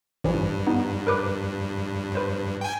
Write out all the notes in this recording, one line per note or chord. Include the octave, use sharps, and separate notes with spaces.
A1 G2 E3 F3
B3 D#4
A#4 B4 D6
B4 C5
G5 G#5